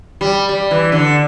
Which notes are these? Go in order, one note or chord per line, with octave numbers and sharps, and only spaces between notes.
G3
G3
E3
D3